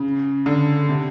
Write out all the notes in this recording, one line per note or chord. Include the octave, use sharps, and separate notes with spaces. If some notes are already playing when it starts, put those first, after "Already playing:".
Already playing: C#3
D3
C3